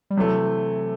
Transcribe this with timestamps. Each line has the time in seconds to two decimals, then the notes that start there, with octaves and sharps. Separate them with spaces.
0.10 G3
0.17 C3 E3 F#3 A3